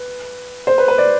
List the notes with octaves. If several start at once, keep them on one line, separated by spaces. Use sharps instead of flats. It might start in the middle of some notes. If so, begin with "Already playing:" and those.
Already playing: B4
C5
B4
B4
D5